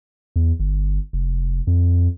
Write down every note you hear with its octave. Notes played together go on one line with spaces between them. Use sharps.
E2
G1
F1
F2